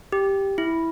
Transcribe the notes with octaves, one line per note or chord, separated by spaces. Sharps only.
G4
E4